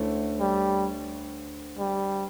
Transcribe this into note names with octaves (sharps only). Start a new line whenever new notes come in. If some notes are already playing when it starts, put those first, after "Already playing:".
Already playing: D2 D3 A3 C#4 E4
G3
G3